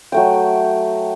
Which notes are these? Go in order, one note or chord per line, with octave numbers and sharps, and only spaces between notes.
F#3 A3 G5